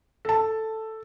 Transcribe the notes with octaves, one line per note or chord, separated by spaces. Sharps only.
A4 A5